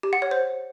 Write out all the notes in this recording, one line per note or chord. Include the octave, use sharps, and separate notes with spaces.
G4
F#5
C#5
C5